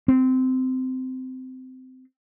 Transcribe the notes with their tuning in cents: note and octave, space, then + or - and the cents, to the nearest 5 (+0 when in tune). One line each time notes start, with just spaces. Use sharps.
C4 -20